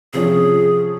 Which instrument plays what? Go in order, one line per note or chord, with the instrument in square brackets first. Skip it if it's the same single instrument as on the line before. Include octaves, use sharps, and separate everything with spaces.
[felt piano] C3 F3 C#4 [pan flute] G#4